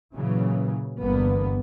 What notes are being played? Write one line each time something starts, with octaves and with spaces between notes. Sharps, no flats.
A#2 C#3 E3 F#3
G1 E2 G2 D3 A#3 B3